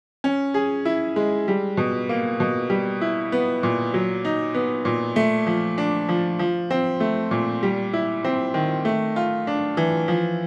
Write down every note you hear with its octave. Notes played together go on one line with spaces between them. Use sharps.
C#4
G#4
E4
G#3
G3
B2
A#3
B2
G3
E4
B3
A#2
F#3
D#4
B3
A#2
A3
F3
D4
F3
F3
C4
A3
A#2
G3
E4
C4
D#3
A3
F4
D4
E3
F3